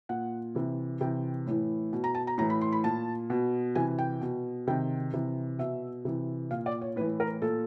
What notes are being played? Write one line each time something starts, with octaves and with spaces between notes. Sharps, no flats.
A#2 F#5
C3 E3
C3 E3 G5
A2 E3
B2
A#5
A5
A#5
A2 E3 A#5
B5
C6
B5
A#2 A5
B2
C3 E3 G#5
G5
B2
C3 D#3 G5
C3 E3
B2 E5
C3 E3
A#2 F5
D5
C#5
A2 E3 B4
A#4
A#2 A4